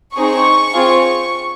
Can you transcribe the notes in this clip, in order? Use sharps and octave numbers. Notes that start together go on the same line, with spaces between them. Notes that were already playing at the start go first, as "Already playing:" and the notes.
C4 D#4 G#4 C#6
C4 F4 G#4